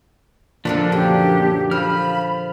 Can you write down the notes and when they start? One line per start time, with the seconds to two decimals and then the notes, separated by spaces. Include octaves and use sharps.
0.65 A#2 D3 F3 A#3 D4 A4
0.92 F#2 G4
1.71 F3 B5 F6